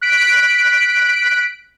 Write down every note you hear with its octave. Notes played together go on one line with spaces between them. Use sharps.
F#6 B6 D7